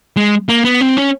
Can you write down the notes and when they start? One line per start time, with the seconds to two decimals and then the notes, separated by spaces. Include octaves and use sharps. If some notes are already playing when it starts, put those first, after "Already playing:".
0.17 G#3
0.49 A#3
0.65 B3
0.81 C4
0.97 C#4